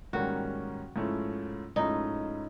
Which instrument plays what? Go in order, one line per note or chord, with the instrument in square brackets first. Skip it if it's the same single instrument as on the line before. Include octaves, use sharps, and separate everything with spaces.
[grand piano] G#2 D#3 G3 A#3 C#4 [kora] F#4
[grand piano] G#2 F3 A3 C#4 E4
[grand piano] G#2 F3 A3 C#4 E4 [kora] D#4